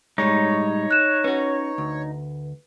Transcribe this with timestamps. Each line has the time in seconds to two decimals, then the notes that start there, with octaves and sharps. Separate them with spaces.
0.18 A2 G3 G#3 D#4 C#5
0.91 F#6 E7
1.24 C#4 F#4 B4
1.78 D2